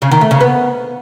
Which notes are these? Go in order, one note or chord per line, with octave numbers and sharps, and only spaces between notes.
C#3
D#3
A3
C#3
B3